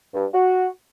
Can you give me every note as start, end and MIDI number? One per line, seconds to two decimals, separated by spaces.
0.14 0.26 43
0.34 0.68 66